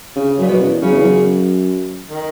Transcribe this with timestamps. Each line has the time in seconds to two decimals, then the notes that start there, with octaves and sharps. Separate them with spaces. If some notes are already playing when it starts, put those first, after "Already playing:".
0.16 C#3
0.38 F#2
0.42 A#2
0.48 F#2 B2
0.60 E2
0.82 F#2 C#3
0.91 E2
1.02 F#2
2.10 D#3